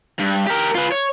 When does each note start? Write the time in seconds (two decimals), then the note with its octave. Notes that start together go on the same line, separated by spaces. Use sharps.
0.19 G2
0.47 G4 A#4
0.75 F4 B4
0.92 C#5